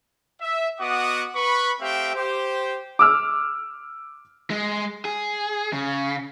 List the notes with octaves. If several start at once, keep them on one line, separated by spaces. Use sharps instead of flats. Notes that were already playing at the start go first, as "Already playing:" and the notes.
E5
B3 F#4 D#5 F#5 D6 D#6
B4 B5 C#6
A3 C4 G4 E5 F5 G5
G4 C5
D6 E6 F6
G#3
G#4
C#3